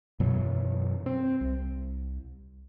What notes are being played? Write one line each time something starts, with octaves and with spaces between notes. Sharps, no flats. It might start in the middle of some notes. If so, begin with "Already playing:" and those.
F#2 B2 E3 F#3
C4
C2